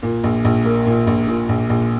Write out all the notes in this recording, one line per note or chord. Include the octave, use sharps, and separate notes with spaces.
A#2
A#1
A#1
A#3
A#2
A#1
A#2
A#1
A#1